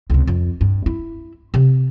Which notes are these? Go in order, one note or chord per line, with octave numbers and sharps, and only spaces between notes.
C#2 C3
F2
G2
E4
C3